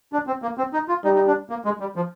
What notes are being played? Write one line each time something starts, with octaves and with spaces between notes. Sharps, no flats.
D4
C4
A#3
C4
D#4
F4
G3 D#4
D#4
D4
A#3
G#3
G3
F3